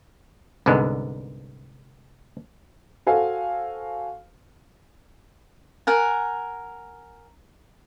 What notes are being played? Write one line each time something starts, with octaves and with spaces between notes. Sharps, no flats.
C2 G#2 D3 G#3 B3
F#4 A4 C5 F5 G#5
A#4 F#5 G#5